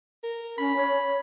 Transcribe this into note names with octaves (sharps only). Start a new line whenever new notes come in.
A#4
C#4 B5
C#5